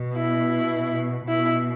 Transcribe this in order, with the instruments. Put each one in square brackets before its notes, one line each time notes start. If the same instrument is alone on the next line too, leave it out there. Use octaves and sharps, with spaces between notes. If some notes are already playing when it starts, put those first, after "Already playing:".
Already playing: [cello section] B2
[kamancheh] E4
[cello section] B2 [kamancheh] E4